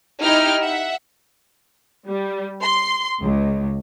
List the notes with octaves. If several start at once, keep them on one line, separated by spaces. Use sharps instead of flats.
D#4 E4 G4 G5 F6
E5 F#5
G3
C6
C#2